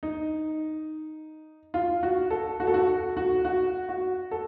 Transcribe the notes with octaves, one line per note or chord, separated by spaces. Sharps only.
D#4
F4
F#4
A4
F#4
A4
F#4
F#4
F#4
F#4
A4